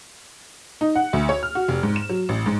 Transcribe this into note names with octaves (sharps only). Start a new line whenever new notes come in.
D#4
F#5
D2
C#5
F6
F#4
F1
G#2
E7
F#3
A1
G#2